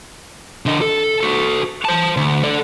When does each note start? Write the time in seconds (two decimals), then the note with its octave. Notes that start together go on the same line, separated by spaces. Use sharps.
0.66 D3 D#5
0.81 A4
1.21 F#4 A4
1.85 C5 A5
2.17 D2
2.43 A4 D5